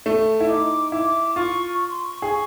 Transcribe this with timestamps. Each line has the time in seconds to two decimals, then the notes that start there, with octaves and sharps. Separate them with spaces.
0.06 A3
0.40 E4
0.49 D#4 D6
0.92 E4 D6
1.36 F4 C#6
1.79 C#6
1.91 C6
2.03 C#6
2.22 G#4